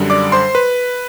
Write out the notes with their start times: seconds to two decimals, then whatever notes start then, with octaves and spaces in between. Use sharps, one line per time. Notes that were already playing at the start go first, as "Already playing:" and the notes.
Already playing: F#2 D3 G3
0.10 D5 D6
0.32 C5 C6
0.55 B4